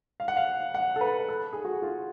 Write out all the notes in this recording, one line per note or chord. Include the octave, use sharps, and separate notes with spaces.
F5
F#5
F5
F#5
A4
B4
A4
G#4
F#4
F4